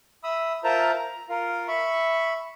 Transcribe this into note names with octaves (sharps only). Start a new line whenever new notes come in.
E5 B5 D#6 E6
F4 A#4 C5 E5 A5 A#5
A#5
F4 A#4 F5
E5 B5 C#6